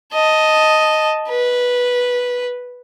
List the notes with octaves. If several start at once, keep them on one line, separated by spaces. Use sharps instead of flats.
D#5 A5
B4